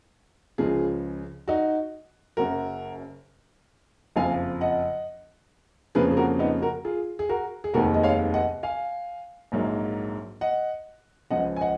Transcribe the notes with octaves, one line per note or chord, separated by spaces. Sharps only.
C#2 C#3 F3 F4 G#4
D#4 F#4
F#1 F#2 C#3 F#4 A#4
F#1 F2 F3 F5 G#5
D#5 F#5
F2 C#3 F3 A#3 G#4 B4
G#4
F#4 A#4
B3 D#4
F#4 A#4
F4 G#4
G#4
F#4 A#4
G#4
F1 D#2 D#3 G#3 B3 F#4 A#4
D#5
C#5 F5
D#5 F#5
F5 G#5
A#1 G#2 F#3 A#3
D#5 F#5
C#2 C#3 F3 D#5 F#5
G#5
D#5 F#5